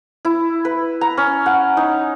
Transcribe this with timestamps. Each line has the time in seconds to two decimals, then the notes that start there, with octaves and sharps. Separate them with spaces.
0.25 E4
0.65 B4
1.01 A#5
1.17 C#4
1.46 F#5
1.77 D#4